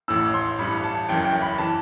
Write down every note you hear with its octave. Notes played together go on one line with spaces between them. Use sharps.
A1 A2 E3 E6
C6
A1 G2 E3 B5
A5
F#1 F#2 E3 G5
G5
B5
E3 A5